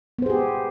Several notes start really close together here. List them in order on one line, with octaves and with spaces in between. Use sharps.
B3 C5 G#4 G4